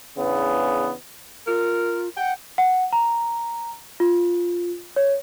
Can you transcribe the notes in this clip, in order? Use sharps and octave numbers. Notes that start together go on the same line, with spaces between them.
E2 C#3 B3 D4
F4 A#4
F#5 G5
F#5
A#5
F4
C#5